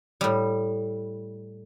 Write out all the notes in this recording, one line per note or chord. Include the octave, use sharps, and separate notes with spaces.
A2 G3